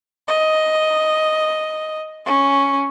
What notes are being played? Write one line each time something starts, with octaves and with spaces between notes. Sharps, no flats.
D#5
C#4